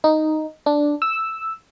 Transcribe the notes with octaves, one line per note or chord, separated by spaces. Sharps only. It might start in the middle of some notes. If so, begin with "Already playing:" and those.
D#4
D4
E6